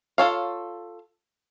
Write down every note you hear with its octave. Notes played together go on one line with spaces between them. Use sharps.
F4 A4 C#5 F5